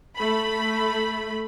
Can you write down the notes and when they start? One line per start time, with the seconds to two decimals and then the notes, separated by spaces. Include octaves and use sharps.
0.16 A3 B5